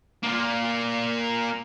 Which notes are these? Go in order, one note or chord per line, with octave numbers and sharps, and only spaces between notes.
A#3 F4